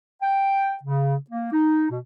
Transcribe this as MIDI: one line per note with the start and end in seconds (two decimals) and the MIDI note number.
0.22 0.75 79
0.84 1.16 49
1.31 1.50 58
1.52 1.86 63
1.90 1.99 47